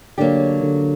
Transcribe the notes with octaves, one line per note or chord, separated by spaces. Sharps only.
D3 F#3 A#3 D4 G4
D3